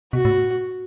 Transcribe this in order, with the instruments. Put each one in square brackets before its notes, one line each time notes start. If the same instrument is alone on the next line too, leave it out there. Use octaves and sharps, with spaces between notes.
[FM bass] B2 [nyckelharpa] F#4
[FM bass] A2